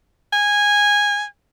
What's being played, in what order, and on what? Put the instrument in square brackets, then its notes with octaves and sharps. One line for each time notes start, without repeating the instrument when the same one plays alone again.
[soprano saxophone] G#5